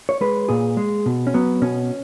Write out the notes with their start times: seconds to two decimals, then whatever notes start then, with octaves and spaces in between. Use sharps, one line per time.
0.09 C#5
0.21 G#3 B4
0.49 A#2 G#4
0.77 G#3
1.06 B2
1.27 C#4
1.34 F#3 B3
1.62 B2 C#4